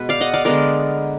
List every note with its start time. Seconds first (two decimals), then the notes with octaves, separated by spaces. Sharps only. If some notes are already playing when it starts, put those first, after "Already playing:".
Already playing: B2 G#3 B4
0.09 D5 F5
0.21 D#5 F#5
0.34 D5 F5
0.45 D3 G#3 B3 A#4 D5